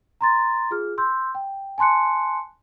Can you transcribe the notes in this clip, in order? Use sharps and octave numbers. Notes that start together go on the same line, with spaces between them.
A#5 C6 A6
F4 G#4 F6
C6 E6 G6
G5
G#5 A5 C6 F#6 C#7